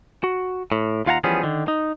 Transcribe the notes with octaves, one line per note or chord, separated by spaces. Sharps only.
F#4
A2
D#2 F4 F5 F#5 G#5 A#5
E3 F3 G3 B3 C#4 G#4
D3 D#3
D#4